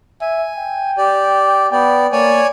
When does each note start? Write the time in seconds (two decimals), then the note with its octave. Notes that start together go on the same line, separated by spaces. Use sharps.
0.21 E5 G#5
0.58 G5
0.98 G4 D5
1.72 B3 D5 G5
2.12 A#3 C#5 D5 G#5